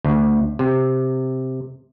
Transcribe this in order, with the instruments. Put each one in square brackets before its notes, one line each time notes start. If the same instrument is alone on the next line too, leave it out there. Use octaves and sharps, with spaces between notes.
[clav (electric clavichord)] D2
C3